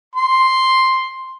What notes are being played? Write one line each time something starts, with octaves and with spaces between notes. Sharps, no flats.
C6